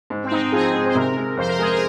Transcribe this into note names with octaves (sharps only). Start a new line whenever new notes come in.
G#2
C4
G#2 D#4
D#4
F3 G#4
G#2
C5
C3 A#4
G#3
F2 C5
A#4
G#3 G#4
A#4